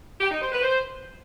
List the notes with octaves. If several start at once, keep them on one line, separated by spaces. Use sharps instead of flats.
G4
D#4
C5
B4
C5